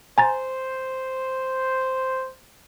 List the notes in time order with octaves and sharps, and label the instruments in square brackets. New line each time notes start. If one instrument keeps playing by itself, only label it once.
[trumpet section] C5 [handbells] G#5 A#5 A6